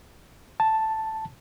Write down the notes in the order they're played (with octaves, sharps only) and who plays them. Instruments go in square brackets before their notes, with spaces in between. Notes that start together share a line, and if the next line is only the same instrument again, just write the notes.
[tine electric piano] A5